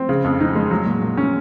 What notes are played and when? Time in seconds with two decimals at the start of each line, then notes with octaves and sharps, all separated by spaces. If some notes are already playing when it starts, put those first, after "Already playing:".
Already playing: C4
0.09 C#3
0.24 F2
0.40 D#4
0.55 G#3
0.71 F#3
0.86 A#2
1.02 A#2
1.17 C#4